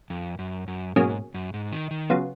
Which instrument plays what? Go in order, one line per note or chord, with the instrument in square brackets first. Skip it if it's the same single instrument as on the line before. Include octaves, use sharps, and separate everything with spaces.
[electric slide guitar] F2
F#2
F#2
[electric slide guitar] G#2 [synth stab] B2 F#3 A#3 C#4 G#4
[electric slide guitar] F#2
G#2
D#3
D#3
[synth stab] C#3 F#3 B3 F4